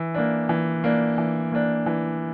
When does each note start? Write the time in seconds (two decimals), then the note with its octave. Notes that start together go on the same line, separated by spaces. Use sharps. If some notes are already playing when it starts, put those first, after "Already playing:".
Already playing: E3
0.15 A#3 D4
0.49 E3
0.84 A#3 D4
1.18 E3
1.52 A#3 D4
1.86 E3